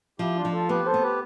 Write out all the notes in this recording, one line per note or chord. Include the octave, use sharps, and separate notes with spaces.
F3 E4 G4
D4 F4
F3
F4 A4
B3 G4 B4
A4 C5
B3
G4 B4